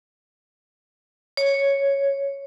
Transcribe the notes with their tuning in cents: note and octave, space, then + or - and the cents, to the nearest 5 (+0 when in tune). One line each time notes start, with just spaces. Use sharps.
C#5 +0